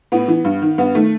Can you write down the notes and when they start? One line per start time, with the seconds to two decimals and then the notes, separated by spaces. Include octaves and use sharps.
0.12 A2 B3
0.28 E3
0.44 G2
0.62 D#3
0.78 G2 B3
0.95 D#3 A3